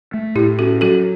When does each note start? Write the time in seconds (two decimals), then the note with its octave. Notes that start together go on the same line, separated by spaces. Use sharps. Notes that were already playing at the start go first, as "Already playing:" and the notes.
0.14 A3
0.35 A2 E4 G4
0.59 C#4 F#4 A4
0.81 F#3 F#4 A4